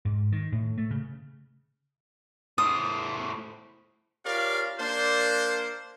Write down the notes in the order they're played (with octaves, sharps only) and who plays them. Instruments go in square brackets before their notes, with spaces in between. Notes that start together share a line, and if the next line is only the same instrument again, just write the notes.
[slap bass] G#2
D#3
A2
A3
C#3
[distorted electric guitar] A2 C5 [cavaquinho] D#6
[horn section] C#4 F4 G4 A#4 D5 F5
A#3 D4 C5